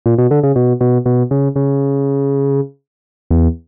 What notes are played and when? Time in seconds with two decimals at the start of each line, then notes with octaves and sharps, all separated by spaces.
0.06 A#2
0.18 B2
0.31 D3
0.43 C#3
0.56 B2
0.81 B2
1.06 B2
1.31 C#3
1.56 C#3
3.31 E2